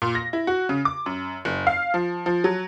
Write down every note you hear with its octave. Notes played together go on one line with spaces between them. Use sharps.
A#2
A#6
E4
F#4
C#3
D6
F#2
F#1
F5
F3
F3
F#3